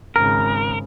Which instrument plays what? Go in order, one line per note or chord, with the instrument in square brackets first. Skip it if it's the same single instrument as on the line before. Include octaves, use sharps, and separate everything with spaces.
[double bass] G#1 C#3 [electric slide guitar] A#4